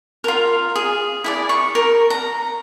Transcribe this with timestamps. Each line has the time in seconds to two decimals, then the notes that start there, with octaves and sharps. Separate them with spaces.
0.24 F4 A#4
0.75 G#4
1.24 E4 G#4 D5
1.49 C#6
1.75 A#4
2.10 A#5